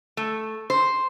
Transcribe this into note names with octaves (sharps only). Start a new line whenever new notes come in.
A3
C5